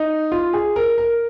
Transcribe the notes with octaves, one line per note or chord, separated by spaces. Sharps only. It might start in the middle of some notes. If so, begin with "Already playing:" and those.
Already playing: D#4
F4
G#4
A#4
A#4